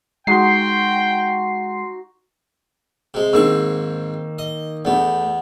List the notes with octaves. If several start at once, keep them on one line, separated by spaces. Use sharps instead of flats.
G#3 D#4 F#4 G5 C6 C#6 C7
C3 G#3
G#2 D#3 A#3 C4 C#6 E6
D#5
E2 A3 B3 D5